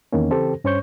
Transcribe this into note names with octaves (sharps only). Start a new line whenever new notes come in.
E2 D#3 A#3 C#4
C#3 E3 C4 G4 A4 C5
G2 C#4 C5 C#5 C#6 G6